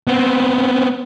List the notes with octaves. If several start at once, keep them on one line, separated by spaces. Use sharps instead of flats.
B3 C4